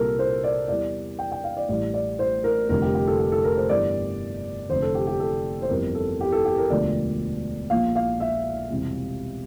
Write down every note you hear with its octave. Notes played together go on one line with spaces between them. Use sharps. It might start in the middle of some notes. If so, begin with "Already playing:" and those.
Already playing: C2 A#2 G3 A4 A#4
C5
D5
E2 E3 G3 D5
G5
G5
F5
D5
A1 A2 E3 G3 D5
D5
C5
A#4
F1 F2 D3 G3 A#4
G4
G4
A4
G4
A4
A#4
C5
G1 G2 E3 G3 D5
F1 F2 D3 C5
A4
G4
G4
A4
C5
G1 F2 E3 G3 A#4
A4
G4
A4
G4
A#4
E1 D2 D3 F3 D5
A#1 A#2 F3 F5
F5
E5
E1 E2 C3 G3